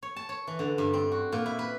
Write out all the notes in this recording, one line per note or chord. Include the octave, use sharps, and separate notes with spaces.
C#5
A5
C#5
E3
D3
G2
C4
F#4
A#2
E4
B4